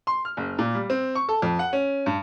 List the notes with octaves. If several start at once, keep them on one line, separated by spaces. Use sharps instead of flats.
C6
F6
F#1
A#2
G3
C4
C#6
A4
F2
F#5
C#4
G2